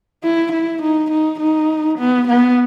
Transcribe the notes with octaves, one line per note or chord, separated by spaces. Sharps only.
E4
E4
D#4
D#4
D#4
B3
B3